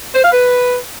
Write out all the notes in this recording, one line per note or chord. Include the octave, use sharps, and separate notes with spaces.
C5
F5
B4